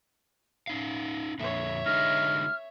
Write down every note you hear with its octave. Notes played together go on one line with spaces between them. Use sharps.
C#4 D#4 F5
F2 A#2 D3 C#5 E5
D3 G#3 D#4 F6